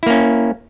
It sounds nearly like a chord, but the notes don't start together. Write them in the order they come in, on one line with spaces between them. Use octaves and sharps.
E4 A#3 C#4